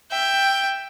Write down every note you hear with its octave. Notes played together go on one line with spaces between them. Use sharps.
E5 G5